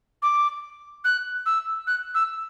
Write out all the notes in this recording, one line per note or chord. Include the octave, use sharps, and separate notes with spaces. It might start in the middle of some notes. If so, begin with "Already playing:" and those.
D6
F#6
E6
F#6
E6